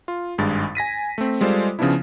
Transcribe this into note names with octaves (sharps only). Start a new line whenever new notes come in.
F4
G#1 G2 G#3 A6
G#5 A#6 B6 D#7
A3 C4
G3 G#3 F4 A4 C5 D5
C#3 F3 B3 C#4 D4 E4